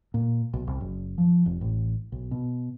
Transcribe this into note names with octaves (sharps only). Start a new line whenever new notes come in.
A#2
B1
C2
F#1
F3
F1
A1
B1
B2